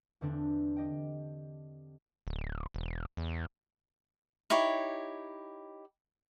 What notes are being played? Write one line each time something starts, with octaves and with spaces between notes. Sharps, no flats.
E2 D3 C4 D4
G4 D#5 G5
D1
E1
E2
D#4 E4 G4 C#5